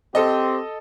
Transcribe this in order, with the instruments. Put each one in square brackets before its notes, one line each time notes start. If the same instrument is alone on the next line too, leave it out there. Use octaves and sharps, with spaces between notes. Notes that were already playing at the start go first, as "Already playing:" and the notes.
[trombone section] C4 G4 C5 [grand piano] A4 D#5